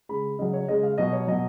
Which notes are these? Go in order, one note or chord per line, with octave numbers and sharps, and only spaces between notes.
C#3 G#3 B5
C#3 F#3 D#5
C#5
C#3 G#3 D#5
F5
B2 F#3 D#5
C#5
B2 F#3 D#5